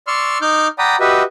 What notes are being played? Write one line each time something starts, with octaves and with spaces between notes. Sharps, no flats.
D5 C6 C#6 E6 F6
D#4 D6 F6 G6
D5 F#5 G5 A#5 B5 D#6
F#4 G4 B4 D#5 E5